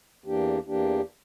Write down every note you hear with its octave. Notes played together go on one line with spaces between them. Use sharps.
E2 E3 A#3 D4 G4
E2 E3 A#3 D4 G4